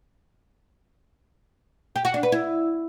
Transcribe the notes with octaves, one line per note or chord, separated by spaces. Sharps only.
G4
F#4
D4
B4
E4